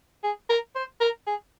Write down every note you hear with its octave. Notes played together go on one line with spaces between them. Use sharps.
G#4
A#4
C5
A#4
G#4